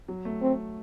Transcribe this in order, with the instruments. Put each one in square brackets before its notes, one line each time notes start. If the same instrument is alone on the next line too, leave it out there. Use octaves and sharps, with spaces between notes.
[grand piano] F#3
A3
[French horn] C4